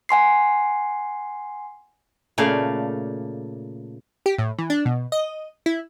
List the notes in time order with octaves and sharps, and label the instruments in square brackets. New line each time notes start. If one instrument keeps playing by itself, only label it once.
[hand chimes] F#5 G#5 C6 C7
[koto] A#2 C#3 A3 D5 F5
[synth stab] G4
A2
E3
D4
B2
D#5
E4